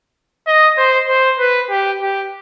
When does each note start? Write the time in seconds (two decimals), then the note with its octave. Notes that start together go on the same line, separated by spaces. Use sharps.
0.47 D#5
0.77 C5
1.08 C5
1.39 B4
1.70 G4
2.02 G4